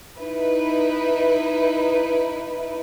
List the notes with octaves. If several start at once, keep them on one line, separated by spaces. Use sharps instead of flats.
D#4 E4 B4